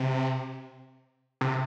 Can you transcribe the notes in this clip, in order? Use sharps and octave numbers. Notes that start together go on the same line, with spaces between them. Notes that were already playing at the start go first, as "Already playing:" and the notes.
Already playing: C3
C3